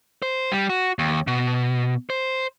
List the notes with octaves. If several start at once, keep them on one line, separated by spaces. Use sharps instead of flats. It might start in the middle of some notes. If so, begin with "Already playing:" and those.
C5
G3
F#4
D#2
B2
C5